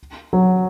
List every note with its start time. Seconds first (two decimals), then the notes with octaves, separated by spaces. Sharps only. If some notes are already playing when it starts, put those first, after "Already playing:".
0.33 F#3